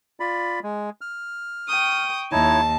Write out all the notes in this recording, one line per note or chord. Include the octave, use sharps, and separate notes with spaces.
F4 D5 B5
G#3
F6
G5 C#6 D#6
D#2 D#4 E4 C#5 A5